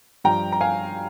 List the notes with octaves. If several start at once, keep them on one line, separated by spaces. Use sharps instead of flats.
G2 F3 G5 A#5
A#5
F5 G#5